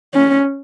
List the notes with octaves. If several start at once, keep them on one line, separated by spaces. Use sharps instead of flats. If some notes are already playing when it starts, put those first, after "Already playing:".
C#4